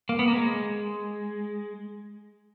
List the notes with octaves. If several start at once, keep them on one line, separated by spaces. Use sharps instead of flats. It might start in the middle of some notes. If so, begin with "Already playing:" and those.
A#3
B3
A#3
G#3